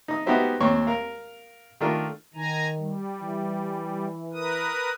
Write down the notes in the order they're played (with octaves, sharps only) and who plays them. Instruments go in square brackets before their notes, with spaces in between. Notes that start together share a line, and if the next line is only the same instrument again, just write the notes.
[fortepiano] D#4 D#6
B3 D#4 F#4 G4 C5 E5
D#2 C4 C5 C#5 C#6
A#4 F5
D#3 A3 D4 F4 A#4
[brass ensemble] D#3 [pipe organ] G#5 A#5
[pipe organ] G3
[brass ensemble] E3
[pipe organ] A#4 B4 D#6